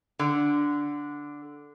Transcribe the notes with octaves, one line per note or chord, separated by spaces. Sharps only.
D3